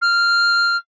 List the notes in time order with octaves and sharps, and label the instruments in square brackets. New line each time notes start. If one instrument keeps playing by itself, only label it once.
[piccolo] F6